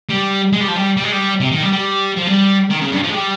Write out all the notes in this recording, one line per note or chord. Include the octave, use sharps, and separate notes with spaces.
G3
G#3
G3
F3
G3
G3
G#3
G3
C3
D#3
G3
G3
F3
G3
D#3
C#3
G2
F3
G#3
G3